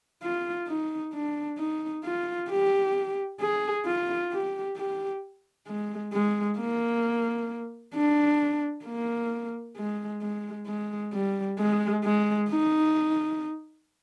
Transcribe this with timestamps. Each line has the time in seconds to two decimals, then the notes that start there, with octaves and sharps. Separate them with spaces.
0.23 F4
0.68 D#4
1.13 D4
1.59 D#4
2.05 F4
2.50 G4
3.41 G#4
3.86 F4
4.32 G4
4.77 G4
5.68 G#3
6.13 G#3
6.59 A#3
7.95 D4
8.85 A#3
9.77 G#3
10.22 G#3
10.67 G#3
11.13 G3
11.58 G#3
12.04 G#3
12.49 D#4